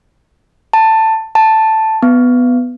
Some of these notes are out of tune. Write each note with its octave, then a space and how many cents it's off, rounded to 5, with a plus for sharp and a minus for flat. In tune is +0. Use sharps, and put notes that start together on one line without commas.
A5 +10
A5 +0
B3 +5